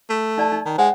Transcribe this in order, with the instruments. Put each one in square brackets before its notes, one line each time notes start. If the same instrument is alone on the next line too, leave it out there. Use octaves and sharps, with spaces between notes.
[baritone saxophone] A3
[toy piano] D#4 D5 A5
D#4
[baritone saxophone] D#3
[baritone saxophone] G#3 [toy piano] C5 F#5